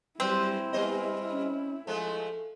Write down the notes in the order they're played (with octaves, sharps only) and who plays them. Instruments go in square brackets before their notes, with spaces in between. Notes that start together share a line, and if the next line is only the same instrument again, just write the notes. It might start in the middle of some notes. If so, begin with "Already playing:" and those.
[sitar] F#3 B4 [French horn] G3 [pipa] C4 [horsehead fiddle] E4
[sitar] G3 C5 D#5 [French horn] B3
[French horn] C#4
[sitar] F3 G#3 A3 [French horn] A4